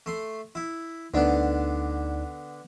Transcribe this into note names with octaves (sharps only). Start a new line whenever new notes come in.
A3 C6
E4
D2 D3 B3 D4 D#4 D5